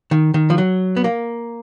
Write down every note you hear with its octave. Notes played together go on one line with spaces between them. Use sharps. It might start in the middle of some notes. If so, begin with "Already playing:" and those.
D#3
D#3
F3
F#3
B3
A#3